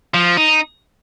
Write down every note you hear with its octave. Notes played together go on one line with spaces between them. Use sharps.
F3
D#4